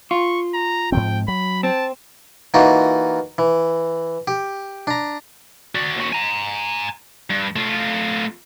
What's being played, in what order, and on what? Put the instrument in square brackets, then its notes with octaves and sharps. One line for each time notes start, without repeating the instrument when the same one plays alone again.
[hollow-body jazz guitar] F4 [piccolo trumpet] C#6
[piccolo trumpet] A#5
[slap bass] G#2 F3 C4 [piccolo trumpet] G5
[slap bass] F#3 [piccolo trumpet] B5
[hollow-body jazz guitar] C4 [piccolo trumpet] A5
[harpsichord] E3 A#3 D#4 F4 F#4
E3
G4
D4 A#5
[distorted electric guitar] F#4 D5
D#2 F#4
G#5 A#5
G2
A3 F4